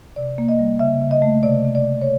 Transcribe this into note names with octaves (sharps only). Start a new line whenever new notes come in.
C3 D5
A#3
D#5
G3
C#3 E5
C#3
D#5
A3
C3 D5
C3
D5
A3
C#5